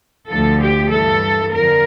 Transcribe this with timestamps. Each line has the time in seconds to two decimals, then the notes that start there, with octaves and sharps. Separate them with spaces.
0.30 D2 D3 F3 A4
0.60 G4
0.90 G2 E3 A4
1.52 F2 D3 F3 A#4